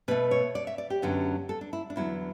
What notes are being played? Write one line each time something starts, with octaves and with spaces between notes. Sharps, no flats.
B2 A3 B4
C#5
D5
E5
D5
G4
F#2 D3 F#3 B3
A4
D4
E4
D4
E2 D3 F#3 B3 E4